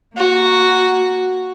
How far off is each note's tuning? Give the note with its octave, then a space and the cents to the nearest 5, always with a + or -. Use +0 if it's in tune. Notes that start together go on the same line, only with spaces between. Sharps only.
A#3 +0 F#4 +0